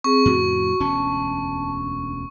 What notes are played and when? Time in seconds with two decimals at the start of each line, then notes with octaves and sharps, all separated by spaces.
0.04 C4 G#4 C#6
0.25 F2 A2 C#3 F#4
0.80 E1 D2 C#4 A5